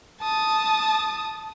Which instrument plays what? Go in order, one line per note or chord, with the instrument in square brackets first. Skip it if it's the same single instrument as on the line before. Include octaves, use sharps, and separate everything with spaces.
[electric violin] A5 D#6